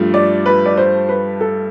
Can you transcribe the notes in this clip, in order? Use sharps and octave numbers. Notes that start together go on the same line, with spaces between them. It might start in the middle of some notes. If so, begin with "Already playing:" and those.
Already playing: G2 F3 A3
D5
B4
D5
C5
B4
A4